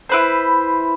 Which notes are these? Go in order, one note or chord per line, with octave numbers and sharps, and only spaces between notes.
E4 B4 C5